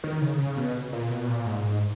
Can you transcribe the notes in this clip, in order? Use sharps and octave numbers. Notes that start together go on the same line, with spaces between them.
D#3
C#3
C#3
B2
A#2
B2
A#2
G#2